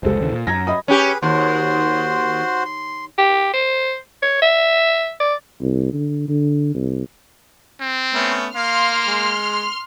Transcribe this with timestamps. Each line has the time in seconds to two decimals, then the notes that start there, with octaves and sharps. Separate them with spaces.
0.03 F1 C#2 G#3 A4 C5
0.20 D#2 C#3 E3
0.32 A#2
0.47 F#2 A#5 G#6 A#6
0.67 D#5 B5 D#6
0.88 C#4 G4 G#4 B4
1.23 D#2 F#4 C5 C6
2.65 C6
3.18 G4
3.54 C5
4.22 C#5
4.42 E5
5.20 D5
5.61 C2
5.93 D3
6.28 D3
6.74 C2
7.80 C4
8.14 A3 B3 C#4
8.55 A#3 F5 C6 F6
9.07 G#3